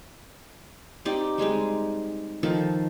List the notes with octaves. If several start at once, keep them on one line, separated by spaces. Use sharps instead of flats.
C4 D#4 G4 D5
G3 G#3 C4 D#4
D#3 F3 A4 A5